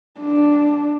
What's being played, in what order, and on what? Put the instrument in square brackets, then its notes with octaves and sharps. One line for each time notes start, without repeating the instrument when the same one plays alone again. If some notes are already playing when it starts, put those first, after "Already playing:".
[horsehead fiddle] D4